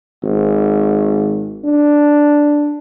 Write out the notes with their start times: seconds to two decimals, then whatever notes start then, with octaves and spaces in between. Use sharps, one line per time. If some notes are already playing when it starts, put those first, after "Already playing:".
0.24 G#1
1.65 D4